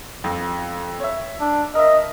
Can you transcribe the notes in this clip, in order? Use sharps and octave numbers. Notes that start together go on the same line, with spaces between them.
F2
C#5 E5
D4
A#4 D#5 E5